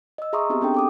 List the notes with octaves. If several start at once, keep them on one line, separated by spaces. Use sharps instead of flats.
D#5 E6
G#4 E5 A#5 C6 C#6 D#6
B3 C4 D#4 G4 G#4
C4 D4 D#4 A4 G5
G5 D6 D#6